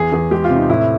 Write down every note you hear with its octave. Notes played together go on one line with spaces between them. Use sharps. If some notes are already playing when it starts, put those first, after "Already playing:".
Already playing: E2 G#4
E2 G#4
G#3 G4
F4
C3
D#4
A2 E4